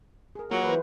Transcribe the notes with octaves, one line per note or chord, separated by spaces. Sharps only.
G#4 A#4
F#3 A#3 F4 G#4 F#5
E3 B4 C5